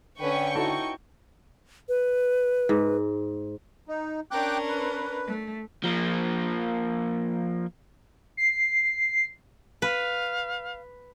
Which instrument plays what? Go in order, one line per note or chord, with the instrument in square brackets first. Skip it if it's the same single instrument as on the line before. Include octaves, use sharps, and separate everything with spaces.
[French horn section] D3 [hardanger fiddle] C#4 B4 [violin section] G5 C#6
[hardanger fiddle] D#4 [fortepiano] E4 F#4 A4
[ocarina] B4
[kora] G#2
[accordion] D#4
[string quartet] C#4 D4 A#4 [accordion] G5 D6 F#6
[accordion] B4
[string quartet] A3
[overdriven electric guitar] F3 A#3
[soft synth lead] C7
[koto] B4 [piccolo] F5